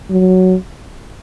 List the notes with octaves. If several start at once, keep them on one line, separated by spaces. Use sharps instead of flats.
F#3